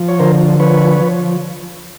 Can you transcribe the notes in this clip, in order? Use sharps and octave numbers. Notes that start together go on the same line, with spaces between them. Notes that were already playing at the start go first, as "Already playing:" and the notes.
Already playing: F3
C#5
D3 A#4 C5
F3 B4 C#5
F3